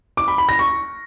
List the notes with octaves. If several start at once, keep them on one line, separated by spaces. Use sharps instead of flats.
D6
B5
B5
A#6
C#6